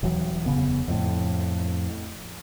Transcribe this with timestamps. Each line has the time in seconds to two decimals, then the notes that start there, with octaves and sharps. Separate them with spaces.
0.03 D#1 E3 F#3
0.46 F1 G2 C#3 B3
0.88 F2 A2